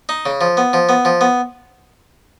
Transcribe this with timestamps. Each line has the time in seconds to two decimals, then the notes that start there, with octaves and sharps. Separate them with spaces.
0.09 D#4
0.26 C#3
0.41 F3
0.57 B3
0.73 F3
0.89 B3
1.05 F3
1.21 B3